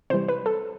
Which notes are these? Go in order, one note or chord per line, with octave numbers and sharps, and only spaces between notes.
C3 E3 G3 C5
B4
A4